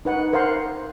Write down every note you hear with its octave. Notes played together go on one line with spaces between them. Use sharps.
D#4 B4 F#5
A#4 C5 F5 F#5 C6